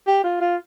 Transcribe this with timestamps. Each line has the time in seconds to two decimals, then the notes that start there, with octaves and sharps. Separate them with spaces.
0.07 G4
0.24 F4
0.41 F4